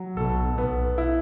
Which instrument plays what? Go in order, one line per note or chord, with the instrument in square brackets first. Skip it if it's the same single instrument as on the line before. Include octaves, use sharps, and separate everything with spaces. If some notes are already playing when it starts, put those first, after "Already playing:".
Already playing: [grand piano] F#3
[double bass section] B1 B2 [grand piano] A4
[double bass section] B1 B2 [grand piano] B3
[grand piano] E4